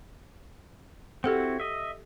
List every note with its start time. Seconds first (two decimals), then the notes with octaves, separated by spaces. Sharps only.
1.24 C4 E4 F#4 G4 A4 F#5
1.60 D#5 E5